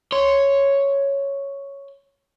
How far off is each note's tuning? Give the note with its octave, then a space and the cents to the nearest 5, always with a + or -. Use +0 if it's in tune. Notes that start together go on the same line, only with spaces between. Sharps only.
C#5 +0 C6 -10